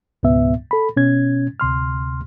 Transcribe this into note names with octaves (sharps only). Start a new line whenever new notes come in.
C#2 G#2 B2 B3 E5
A4 B5
B2 C#4 G#6
D2 C3 C6 F6